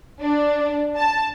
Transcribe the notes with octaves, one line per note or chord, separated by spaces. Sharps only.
D4
A5